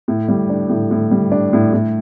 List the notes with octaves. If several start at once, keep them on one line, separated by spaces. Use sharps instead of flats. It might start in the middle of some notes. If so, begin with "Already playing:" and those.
A2
G3
D4
A2
A2
G3
D4
A2
A2